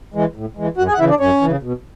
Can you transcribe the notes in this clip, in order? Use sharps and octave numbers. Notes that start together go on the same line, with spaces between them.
E3 G#3
A2
E3 G#3
F#2 F#4 F#5
G#4 G#5
F#5
C#3 E3 E4 E5
D4 D5
F#2 C#4 C#5
C#3 E3
B2